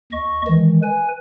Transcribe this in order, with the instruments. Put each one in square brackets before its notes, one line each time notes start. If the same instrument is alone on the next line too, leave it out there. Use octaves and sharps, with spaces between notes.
[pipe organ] D#2 D#5 C#6
D#3 E3 G#3
B4 G#5